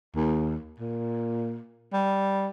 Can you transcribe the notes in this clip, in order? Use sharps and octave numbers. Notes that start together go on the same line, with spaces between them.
D#2
A#2
G3